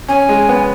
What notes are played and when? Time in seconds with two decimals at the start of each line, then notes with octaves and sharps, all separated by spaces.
0.08 C#4 G#5
0.29 G#3
0.49 B3